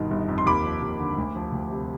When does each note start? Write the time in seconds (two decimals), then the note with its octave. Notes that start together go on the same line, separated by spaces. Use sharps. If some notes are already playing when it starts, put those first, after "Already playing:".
Already playing: G1 B2 D#3
0.11 G1
0.28 F2
0.38 C6
0.46 D#2 B5 D6
0.64 F3
0.82 D#2
0.99 D3
1.18 D2
1.36 F3
1.52 D2
1.70 C3